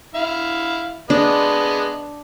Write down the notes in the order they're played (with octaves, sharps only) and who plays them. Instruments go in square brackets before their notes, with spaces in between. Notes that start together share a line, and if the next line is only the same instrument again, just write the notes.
[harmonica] E4 F5
[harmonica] G#3 B3 D#5 [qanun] D4